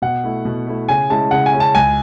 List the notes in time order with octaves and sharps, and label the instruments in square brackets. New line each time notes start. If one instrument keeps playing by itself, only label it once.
[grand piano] B2 [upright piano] F#5
[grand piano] A3 E4
B2
A3 E4
[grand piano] C#3 [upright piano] G#5
[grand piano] G#3 C#4 E4 [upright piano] A5
[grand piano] C#3 [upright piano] F#5
[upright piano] G#5
[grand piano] G#3 C#4 E4
[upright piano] A5
[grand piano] C#2 [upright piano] G#5